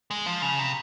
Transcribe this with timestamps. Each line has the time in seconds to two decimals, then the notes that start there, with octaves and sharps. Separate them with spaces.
0.11 G#3
0.26 F3
0.42 C#3
0.59 C3